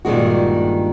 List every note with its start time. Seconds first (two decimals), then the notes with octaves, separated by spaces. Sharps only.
0.05 G2 A#2 D#3 G#3 F#4